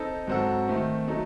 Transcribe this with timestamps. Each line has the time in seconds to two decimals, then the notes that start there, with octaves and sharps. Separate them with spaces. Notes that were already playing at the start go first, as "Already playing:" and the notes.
Already playing: C4 D#4 A4
0.27 G#2 F#3 C4 F#4 A4
0.68 D#3 A3 C4
1.07 F#3 A3 D#4